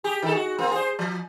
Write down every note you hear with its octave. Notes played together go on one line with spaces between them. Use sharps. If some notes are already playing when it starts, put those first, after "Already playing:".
G4 G#4
D#3 A4
F#4
A#3 C4
G#4 C5
F3